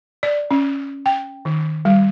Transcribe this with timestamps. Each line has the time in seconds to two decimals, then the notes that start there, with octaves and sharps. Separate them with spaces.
0.23 D5
0.51 C#4
1.06 G5
1.45 D#3
1.85 G3